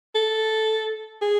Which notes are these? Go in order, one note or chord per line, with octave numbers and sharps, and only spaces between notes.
A4
G#4